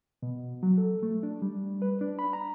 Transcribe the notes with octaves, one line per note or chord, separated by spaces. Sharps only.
B2
F#3
A4
A3
D4
G3
B4
D4
B5
A#5